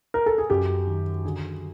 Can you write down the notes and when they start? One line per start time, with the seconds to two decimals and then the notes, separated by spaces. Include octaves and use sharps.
0.14 A#4
0.26 A4
0.38 G#4
0.50 F#2 G4
0.87 D#3
1.25 D3 G#4